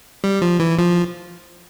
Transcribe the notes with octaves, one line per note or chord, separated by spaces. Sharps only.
G3
F3
E3
F3